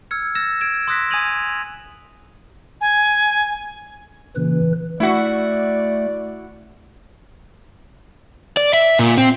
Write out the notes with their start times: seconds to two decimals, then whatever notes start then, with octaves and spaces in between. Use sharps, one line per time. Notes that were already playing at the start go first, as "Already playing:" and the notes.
0.11 E6 F6 G#6 C#7
0.35 E6 A6 A#6 E7
0.61 G#6 D7 E7
0.88 C6 D#6 E6 F#6 A#6 B6
1.11 G#5 D#6 G#6 D#7 F7 F#7
2.81 G#5
4.36 A#2 C#3 E3 B4
5.00 A3 E4 F#4 D5
8.57 D5
8.74 E5
8.99 A#2
9.18 C4